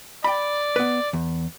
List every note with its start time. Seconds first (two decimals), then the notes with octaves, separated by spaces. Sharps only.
0.24 D5 G5 B5
0.76 B3 B4
1.13 E2